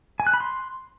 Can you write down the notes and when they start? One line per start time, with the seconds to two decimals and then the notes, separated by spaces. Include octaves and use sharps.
0.20 G#5
0.27 F#6
0.34 B5
0.40 C6